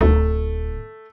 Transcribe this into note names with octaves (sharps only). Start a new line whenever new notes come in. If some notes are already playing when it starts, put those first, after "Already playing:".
D1 D2 A3 E4